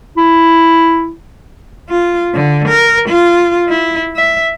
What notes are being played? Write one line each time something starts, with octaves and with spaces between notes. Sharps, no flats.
E4
F4
D3
A#4
F4
E4
E5